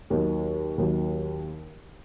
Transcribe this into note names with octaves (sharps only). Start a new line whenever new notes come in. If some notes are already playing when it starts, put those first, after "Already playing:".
D#2 D#3 F#3
D#2 D#3 F#3